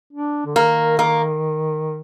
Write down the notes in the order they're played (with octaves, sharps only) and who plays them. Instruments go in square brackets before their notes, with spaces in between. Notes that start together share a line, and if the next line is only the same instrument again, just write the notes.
[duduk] D4
D3
[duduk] D#3 [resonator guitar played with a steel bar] A#3
[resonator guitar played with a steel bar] A#3